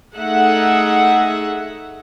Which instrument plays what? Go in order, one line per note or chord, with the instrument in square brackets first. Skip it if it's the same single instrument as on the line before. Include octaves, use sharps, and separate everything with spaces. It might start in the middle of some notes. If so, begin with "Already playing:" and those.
[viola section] A3 D#4 G#4 E5 F#5